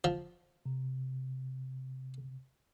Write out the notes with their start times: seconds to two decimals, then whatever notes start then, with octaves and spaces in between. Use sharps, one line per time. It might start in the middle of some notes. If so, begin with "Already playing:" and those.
0.04 F3
0.66 C3